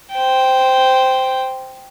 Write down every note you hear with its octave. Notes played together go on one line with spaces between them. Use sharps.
C5 G5